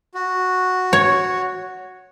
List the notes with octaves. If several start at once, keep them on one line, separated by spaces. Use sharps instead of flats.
F#4
C#5